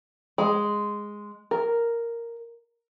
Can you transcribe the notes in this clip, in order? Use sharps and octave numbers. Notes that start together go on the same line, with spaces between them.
G#3
A#4